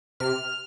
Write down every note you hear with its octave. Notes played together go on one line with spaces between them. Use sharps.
C3 F6